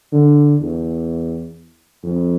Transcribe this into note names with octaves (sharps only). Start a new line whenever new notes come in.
D3
E2
F2